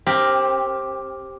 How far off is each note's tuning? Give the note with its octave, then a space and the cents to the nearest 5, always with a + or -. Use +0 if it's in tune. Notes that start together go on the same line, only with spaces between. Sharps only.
C4 +25 G4 +0 A#4 +0